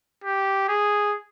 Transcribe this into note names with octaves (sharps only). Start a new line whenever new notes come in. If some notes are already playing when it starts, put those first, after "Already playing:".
G4
G#4